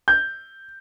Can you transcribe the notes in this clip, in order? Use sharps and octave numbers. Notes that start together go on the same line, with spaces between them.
G6